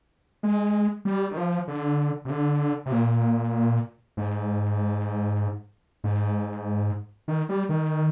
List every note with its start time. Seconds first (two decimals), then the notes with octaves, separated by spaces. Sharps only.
0.43 G#3
1.05 G3
1.31 D#3
1.37 F3
1.68 D3
2.25 C3
2.30 D3
2.86 C3
2.92 A#2
4.17 G#2
6.04 G#2
7.28 D#3
7.49 G3
7.69 D#3